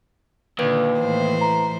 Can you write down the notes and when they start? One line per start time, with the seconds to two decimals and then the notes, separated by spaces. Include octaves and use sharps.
0.59 D#2 A#2 D3 B4
1.00 A2 E3 C5
1.41 A#5